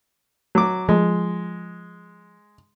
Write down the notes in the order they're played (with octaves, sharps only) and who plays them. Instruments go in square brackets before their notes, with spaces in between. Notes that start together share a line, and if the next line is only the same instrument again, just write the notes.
[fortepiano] F#3 D6
[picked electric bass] F3 [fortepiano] G#3